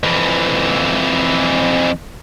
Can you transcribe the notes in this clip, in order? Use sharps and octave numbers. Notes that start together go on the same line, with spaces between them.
F2 E3